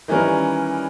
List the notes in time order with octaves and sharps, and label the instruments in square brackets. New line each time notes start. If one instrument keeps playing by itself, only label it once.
[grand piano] D#3 E3 G3 C#4 A#4